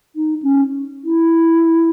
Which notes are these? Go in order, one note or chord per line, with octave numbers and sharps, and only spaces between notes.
D#4
C#4
E4